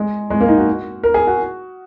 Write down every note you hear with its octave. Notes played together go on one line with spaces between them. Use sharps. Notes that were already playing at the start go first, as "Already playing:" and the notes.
Already playing: G#3
G#3
A#3
D#4
F#4
A#4
G#4
F#4